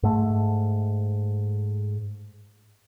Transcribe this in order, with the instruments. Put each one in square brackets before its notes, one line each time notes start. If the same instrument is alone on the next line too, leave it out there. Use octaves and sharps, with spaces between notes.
[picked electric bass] G#2 A3